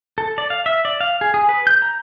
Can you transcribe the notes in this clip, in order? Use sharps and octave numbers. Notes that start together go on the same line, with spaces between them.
A4
D5
F5
E5
D5
F5
G#4
G#4
B4
G6
A#5